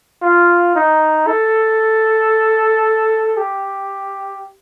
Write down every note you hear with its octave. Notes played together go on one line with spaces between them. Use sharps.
F4
D#4
A4
G4